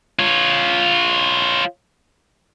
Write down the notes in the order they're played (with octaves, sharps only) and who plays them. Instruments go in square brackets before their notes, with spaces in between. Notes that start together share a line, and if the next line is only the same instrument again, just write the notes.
[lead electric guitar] F4 C#5